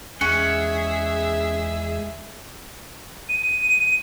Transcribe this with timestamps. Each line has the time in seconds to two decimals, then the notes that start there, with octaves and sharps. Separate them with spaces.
0.21 E2 G#3 C#4 G#4 E5 F#5
3.29 D#7